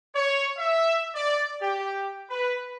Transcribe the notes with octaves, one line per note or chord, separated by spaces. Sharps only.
C#5
E5
D5
G4
B4